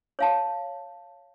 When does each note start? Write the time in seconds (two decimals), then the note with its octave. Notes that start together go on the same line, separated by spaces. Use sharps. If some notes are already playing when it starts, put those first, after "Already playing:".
0.19 C#5 F5 A5